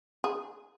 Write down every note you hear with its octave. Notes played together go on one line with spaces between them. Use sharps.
G#4